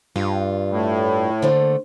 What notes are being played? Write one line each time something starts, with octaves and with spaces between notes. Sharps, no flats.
G2 F4
A2
D3 A3 A#3 C5